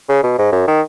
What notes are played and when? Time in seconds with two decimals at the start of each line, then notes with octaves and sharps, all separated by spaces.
0.09 C#3
0.23 B2
0.38 G#2
0.52 F#2
0.68 D#3